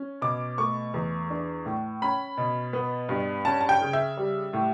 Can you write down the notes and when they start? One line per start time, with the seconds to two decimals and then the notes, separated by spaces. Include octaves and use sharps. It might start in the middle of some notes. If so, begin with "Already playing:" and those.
Already playing: C#4
0.22 B2 D6
0.58 A3 C#6
0.94 E2
1.30 D4
1.66 A2
2.02 C#4 B5
2.38 B2
2.73 B3
3.09 G2
3.45 C#4 A5
3.61 A5
3.69 G5
3.82 C#3
3.93 E5
4.17 G3
4.53 A2